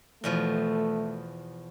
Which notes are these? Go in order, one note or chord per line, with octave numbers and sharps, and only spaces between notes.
E2 B2 F3 A3